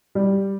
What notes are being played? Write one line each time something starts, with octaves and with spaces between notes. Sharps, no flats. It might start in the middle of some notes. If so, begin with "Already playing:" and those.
G3